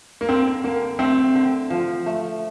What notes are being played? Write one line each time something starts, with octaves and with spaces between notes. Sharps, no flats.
A#3
D3 C4
D3 A#3
A3 C4
D3
F3
A3